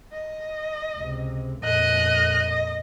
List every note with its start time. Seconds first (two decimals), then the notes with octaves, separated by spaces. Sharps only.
0.12 D#5
0.97 C#2 C3
1.64 F2 A#2 D#5 F#6
2.49 D#5